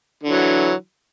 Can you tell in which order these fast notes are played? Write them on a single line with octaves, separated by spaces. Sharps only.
D3 E3 F#3